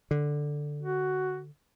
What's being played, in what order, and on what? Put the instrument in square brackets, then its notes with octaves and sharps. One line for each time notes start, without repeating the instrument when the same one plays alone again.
[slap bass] D3
[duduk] F#4